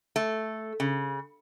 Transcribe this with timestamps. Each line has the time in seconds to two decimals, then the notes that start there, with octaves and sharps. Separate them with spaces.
0.16 A3
0.80 C#3